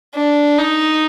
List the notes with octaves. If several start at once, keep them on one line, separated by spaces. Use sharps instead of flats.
D4
D#4